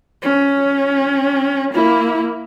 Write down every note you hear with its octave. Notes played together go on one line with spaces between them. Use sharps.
C#4
A#3 E4